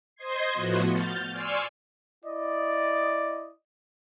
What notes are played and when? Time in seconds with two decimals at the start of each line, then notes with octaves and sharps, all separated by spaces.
0.16 C5 D#5 C6 G#6 C7
0.53 A2 F3 B3 F#4
0.91 F6 G6 A6
1.30 D5 G#5 C6 C#6 E6 F6
2.24 E4 D5 D#5